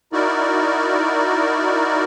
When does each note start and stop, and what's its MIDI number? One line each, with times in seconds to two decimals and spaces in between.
0.13 2.04 63
0.13 2.04 64
0.13 2.04 66
0.13 2.04 70
0.13 2.04 74